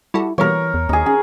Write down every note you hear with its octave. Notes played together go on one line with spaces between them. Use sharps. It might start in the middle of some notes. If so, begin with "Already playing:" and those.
G3 E4 F#4 A4
B2 E3 G3 A#3 A#4 C#5
E2
D#2 D#4 G#4
C#4 G#4